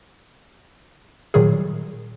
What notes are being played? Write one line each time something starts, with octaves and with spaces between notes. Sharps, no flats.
A#2 D#3 F#3 G3 G#4